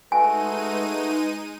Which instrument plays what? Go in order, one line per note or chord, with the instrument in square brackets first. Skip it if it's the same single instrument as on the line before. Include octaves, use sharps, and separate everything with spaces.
[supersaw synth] G#3 D#4 D#7 [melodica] A3 F#4 [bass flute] B4 [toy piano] G#5